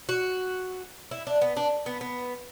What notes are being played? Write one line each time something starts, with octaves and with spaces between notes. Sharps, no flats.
F#4
E4
D4
B3
D4
B3
B3